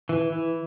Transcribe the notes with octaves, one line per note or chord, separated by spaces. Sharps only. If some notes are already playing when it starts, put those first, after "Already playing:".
E3
E3